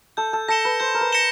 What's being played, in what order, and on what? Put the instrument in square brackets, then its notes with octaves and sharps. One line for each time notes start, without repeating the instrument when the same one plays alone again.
[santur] A4 [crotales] G6
[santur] A4
[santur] A4 [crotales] A#6 C#7 E7 G7
[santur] B4
[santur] C5 [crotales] G6
[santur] A#4
B4
[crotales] A#6 C#7 E7 G7